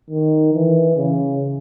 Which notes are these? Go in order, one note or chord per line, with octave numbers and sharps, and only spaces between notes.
D#3
E3
C#3